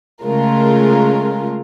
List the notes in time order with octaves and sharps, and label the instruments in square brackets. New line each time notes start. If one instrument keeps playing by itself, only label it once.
[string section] C#3 G#3 A3 F4 A#4